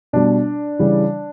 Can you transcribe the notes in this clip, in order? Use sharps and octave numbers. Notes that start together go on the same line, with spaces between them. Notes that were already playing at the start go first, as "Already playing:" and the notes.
B2 G3 D4
C#3 E3 G3